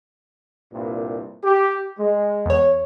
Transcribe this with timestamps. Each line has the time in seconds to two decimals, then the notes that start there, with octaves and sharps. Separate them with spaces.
0.72 C2 G2 A#2
1.44 G4
1.99 G#3
2.46 E2 C#5